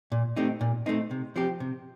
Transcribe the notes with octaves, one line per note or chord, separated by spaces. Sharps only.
A#2
A3 C4 D#4 G4
A#2
A3 C4 D#4
C3
F3 C4 G4
C3